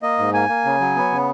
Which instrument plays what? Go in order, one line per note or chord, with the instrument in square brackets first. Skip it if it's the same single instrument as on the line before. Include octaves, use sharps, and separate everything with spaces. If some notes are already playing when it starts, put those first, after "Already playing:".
[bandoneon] A#3 D#5
G#2
A#3 G#5
A#3
C#3
F#3
B3
C#3